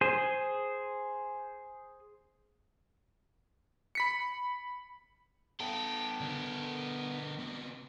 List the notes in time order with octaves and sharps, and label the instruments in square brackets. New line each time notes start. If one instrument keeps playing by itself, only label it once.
[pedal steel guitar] G#4 C5
[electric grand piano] B5 B6 C#7
[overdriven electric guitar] B3 A4 [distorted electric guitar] G5
[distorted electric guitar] D3 A#4
C3 B3